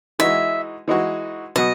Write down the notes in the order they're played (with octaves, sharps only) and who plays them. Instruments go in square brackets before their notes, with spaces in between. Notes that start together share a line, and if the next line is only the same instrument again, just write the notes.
[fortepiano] E3 G#3 D#4 F#4 [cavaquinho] E5
[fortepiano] E3 G#3 D#4 F#4
[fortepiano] B2 F#3 B3 F#4 [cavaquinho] D#5